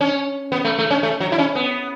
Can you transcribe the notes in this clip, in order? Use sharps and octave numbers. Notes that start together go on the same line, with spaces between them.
C#4
B3
A3
A3
C#4
A3
F#3
E4
C#4
B3